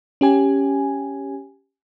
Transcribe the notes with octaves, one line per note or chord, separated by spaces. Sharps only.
C#4 G4 G#5